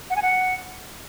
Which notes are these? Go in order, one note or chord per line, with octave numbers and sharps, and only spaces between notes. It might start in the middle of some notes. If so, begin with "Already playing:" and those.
F#5
G#5
F#5